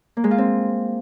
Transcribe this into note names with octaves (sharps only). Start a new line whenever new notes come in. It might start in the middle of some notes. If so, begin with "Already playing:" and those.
A#3
G#3
F4
C4